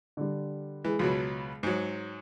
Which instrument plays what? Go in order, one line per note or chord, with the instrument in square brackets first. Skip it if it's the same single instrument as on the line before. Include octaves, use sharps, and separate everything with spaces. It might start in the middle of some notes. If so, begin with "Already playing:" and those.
[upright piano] D3 G3
[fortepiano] E3 [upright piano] G#3 G#4
[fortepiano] C#2 B2 F#3
G#2 F#3